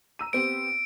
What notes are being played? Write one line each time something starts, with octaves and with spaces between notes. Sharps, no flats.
A#5 E6 D#7
B3 C4 G4 D7